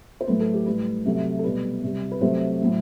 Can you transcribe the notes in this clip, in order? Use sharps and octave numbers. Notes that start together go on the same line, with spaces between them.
C5
A2 F#3 A3 B4
A4
G4
A2 G3 B4
C3 F#3 A3
A4
B2 G3 B4
C3 G3
B4
C3 F#3 A3 C5
A2 F#3 A3